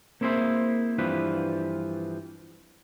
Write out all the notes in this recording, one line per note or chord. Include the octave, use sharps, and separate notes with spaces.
A#3 C4 E4 G#4 C5 E5
G2 E3 F3 C4 B4